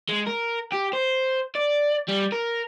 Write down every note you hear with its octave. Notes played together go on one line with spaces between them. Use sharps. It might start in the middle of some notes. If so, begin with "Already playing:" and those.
G#3
A#4
G4
C5
D5
G3
A#4